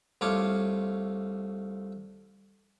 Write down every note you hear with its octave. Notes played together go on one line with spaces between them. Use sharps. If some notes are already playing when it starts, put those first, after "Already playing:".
C2 A3 F4 C#5 D6